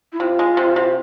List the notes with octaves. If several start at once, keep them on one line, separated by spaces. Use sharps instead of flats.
E4
C3 F4
G#3
C3
C3